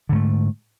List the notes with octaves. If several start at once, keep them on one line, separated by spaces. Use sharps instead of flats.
G#2 D3 A3